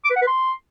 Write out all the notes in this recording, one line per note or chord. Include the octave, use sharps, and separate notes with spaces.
D6
B4
F#5
B4
C6